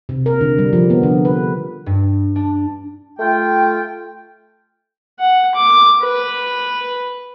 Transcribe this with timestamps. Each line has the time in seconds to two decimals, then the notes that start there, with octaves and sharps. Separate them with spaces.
0.09 C3
0.26 A#4
0.41 D3
0.58 G3
0.73 F3
0.90 B3
1.03 D3
1.25 B4
1.86 G2
2.36 D4
3.19 A3 F4 G5
5.19 F#5
5.55 D6
6.02 B4